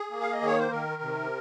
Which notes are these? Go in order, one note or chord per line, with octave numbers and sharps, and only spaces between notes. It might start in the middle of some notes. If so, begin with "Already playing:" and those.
Already playing: G#4
A#3
F5
D#5
D#3
C#5
C5
D#3 A#4
C3